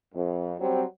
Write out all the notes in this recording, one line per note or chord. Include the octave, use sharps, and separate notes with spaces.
F2
F#3 G3 C4